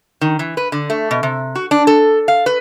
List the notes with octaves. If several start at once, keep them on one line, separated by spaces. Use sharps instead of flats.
D#3
E3
B4
D3
A3
B2
C3
F#4
D4
A4
F5
B4